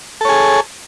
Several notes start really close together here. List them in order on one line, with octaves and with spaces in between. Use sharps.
A4 C#5 G#4